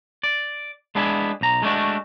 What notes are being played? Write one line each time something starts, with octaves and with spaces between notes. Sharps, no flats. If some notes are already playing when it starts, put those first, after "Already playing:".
D5
G#3 B3 D4 E4 G#4
B1 A#5
G#3 A3 C#4 D4 F#4